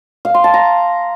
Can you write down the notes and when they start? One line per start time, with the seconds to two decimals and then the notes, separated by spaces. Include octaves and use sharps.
0.25 F5
0.34 C6
0.44 A5
0.54 A#5